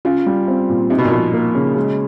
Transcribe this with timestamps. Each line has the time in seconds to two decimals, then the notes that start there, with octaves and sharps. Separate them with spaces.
0.05 C#3 F4
0.26 G3
0.48 C4
0.69 A#2
0.90 C3 D#4
0.98 B2
1.05 A#2
1.12 B2 F3
1.34 A#3
1.55 C#3
1.76 G#3